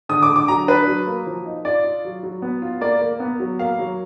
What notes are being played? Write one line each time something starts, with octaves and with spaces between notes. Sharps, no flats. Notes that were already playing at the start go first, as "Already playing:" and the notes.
D3 D#6
D6
D3
D6
F#3 A#5
D4 B4
F#3
A#3
F3
D#4
F4 D5
F4
F#3
F#3
B3
F4
A#3 D5
A#3
B3
F#3
A#3 F5
F#3